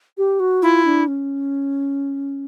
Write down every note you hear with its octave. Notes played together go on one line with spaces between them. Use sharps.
G4
F#4
E4 F4
D4
C#4